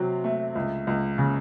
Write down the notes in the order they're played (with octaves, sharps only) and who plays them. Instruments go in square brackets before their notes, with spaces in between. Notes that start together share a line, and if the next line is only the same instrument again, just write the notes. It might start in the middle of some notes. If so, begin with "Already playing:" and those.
Already playing: [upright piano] C3 F#3 C4
A3
C#2
C#2
C#3